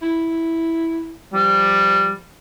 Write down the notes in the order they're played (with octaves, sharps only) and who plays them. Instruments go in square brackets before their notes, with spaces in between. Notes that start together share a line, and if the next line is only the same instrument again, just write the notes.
[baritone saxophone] E4
[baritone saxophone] F3 [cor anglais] G3